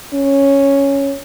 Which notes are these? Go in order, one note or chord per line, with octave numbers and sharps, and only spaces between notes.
C#4